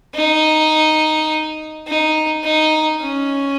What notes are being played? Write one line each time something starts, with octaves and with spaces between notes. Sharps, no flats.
D#4
D#4
D#4
C#4